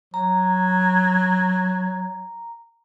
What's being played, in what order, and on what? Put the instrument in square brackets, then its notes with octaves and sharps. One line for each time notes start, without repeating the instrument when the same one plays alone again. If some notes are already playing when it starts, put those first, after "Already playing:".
[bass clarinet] F#3 [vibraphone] A#5